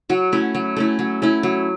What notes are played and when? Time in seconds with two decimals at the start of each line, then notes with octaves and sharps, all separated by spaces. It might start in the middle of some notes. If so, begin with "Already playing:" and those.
0.09 F#3 F#4
0.32 A3 C#4 E4
0.55 F#3
0.76 A3 C#4 E4
0.99 F#3
1.22 A3 C#4 E4
1.43 F#3